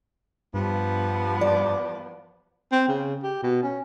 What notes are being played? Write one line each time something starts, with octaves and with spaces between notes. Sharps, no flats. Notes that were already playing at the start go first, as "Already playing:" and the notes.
G2 F3 G3 B3
D5
C4
C#3
G4
B2
C#4